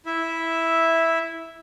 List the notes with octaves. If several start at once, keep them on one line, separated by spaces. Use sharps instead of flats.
E4 E5